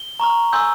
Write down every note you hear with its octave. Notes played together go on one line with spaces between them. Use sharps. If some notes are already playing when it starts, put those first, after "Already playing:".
Already playing: G7
A#5 C#6 F6
G#5 C6 E6 G6